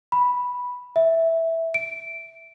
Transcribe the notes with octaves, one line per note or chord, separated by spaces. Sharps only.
B5
E5
D7